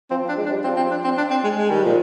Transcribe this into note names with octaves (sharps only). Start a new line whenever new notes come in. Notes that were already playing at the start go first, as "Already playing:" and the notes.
F3 C4
F3
D4
G#3
D4
G3
F3 C4
C4
D4
C4
D4
C4
G#3
G#3
D#3 G3
A#2 F3